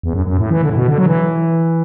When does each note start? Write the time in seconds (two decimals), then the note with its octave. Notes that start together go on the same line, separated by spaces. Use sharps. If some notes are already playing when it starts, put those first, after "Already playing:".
0.03 E2
0.14 F#2
0.26 F#2
0.39 A2
0.50 E3
0.63 D3
0.70 A2
0.76 B2
0.88 D3
0.98 F#3
1.06 E3